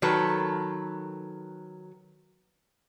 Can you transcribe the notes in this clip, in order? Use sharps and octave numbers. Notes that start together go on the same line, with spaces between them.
D#3 F#3 A4 B4